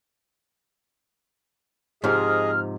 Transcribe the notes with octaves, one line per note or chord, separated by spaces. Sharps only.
G#2 C3 F3 G#4 D#5 F6